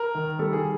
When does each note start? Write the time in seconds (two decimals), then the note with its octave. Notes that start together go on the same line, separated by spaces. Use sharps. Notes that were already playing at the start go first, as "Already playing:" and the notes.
Already playing: A#4
0.15 D#3
0.39 G3 A4
0.53 G#4